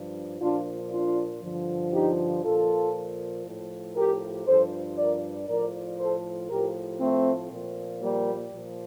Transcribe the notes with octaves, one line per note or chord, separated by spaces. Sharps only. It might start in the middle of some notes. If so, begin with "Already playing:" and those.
Already playing: G2 F3
A#2 F3 D4 F4
D4 F4
G2 D3 F3
D#4 G4
A#2 F3 F4 A4
A2 F3
G4 A#4
G2 F3 A4 C5
A#4 D5
A2 F3 A#4 D5
A4 C5
A2 F3 G4 A#4
A3 C4
A#2 F3
G3 A#3
A#2 F3